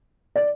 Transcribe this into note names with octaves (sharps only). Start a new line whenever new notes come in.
D5